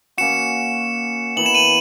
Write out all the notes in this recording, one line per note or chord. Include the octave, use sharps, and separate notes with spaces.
A#3 C#4 F#4 C#7 E7
E3 B3 E4 A#4 F#7
E7
D#7 F#7